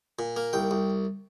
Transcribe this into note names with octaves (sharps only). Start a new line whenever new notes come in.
A#2
A#3
C2 G5
C2